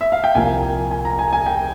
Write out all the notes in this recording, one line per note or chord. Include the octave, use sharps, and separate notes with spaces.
E5
F5
G5
C2 A#2 F3 A#3 G#5
G#5
A#5
G#5
G#5
G5